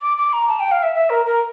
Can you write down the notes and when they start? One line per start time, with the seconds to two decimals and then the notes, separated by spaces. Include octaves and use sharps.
0.02 D6
0.17 D6
0.33 A#5
0.48 A5
0.60 G5
0.71 F5
0.83 E5
0.95 E5
1.10 A#4
1.26 A#4